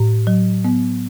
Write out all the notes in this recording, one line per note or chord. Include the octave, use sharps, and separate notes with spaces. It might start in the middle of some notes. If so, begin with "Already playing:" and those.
Already playing: A2
F#3
B3